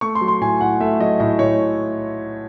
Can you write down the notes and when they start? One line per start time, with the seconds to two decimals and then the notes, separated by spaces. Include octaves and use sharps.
0.01 A3 C#6
0.15 C6
0.21 F#3
0.28 C6
0.41 A2 G#5
0.61 A2 F#5
0.80 A3 E5
1.00 F#3 D#5
1.20 A2 D#5
1.39 A2 C#5